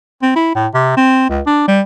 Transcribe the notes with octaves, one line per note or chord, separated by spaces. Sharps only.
C4
E4
A2
C3
C4
C#2
D4
G3